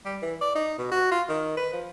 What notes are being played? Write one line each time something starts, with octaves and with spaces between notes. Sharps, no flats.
G3
E3
D5
D#4
B2
F#4
F4
D#3
B4
F3